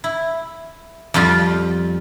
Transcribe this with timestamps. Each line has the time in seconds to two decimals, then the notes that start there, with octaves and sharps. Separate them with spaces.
0.04 E4
1.14 F2 G3 F4